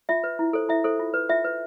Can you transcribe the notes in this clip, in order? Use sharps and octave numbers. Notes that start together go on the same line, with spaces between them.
F4 E5
B4
E4
A4 C5
E4 E5
A4 C5
F4
B4
F4 E5
B4